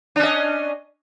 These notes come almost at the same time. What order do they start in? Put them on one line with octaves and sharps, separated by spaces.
D4 C#4 D#5